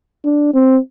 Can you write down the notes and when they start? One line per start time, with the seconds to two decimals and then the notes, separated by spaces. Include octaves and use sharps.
0.25 D4
0.54 C4